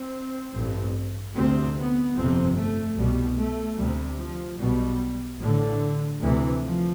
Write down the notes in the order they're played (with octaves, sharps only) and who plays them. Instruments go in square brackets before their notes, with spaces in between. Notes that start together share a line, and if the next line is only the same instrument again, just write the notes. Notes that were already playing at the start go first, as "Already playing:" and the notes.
Already playing: [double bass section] C4
A1 G2
D2 C3 C4
B3
G1 F2 C3 C4
A3
C2 B2 G3
A3
D2 C3 G3
F3
B1 B2 G3
A1 A2 D3
D2 C3 E3
F3